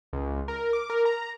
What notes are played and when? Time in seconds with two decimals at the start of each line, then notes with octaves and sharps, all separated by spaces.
0.13 C#2
0.48 A#4
0.73 D6
0.90 A#4
1.05 A#5